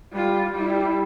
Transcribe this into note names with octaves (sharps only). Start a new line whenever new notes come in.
G3 F4
G3 E4